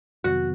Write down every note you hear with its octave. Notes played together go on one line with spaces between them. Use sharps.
F2 C3 D#3 F#3 B3 F#4